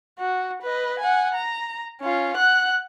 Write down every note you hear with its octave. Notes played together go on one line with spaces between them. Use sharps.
F#4
B4 D#5
F#5 G#5
A#5
C#4 F4
F#5 F#6